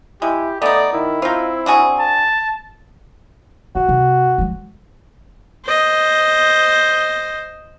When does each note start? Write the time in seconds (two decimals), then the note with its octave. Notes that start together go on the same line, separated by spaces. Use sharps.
0.22 G#3 E4 G4
0.62 A3 B3 D#4 D5
0.94 D#3 E4
1.22 C4 D#4 F4
1.66 D4 F#4 G#4
2.00 A5
3.75 D#3 F#4
3.89 C3
4.38 F3 G#3
5.64 C5 D#5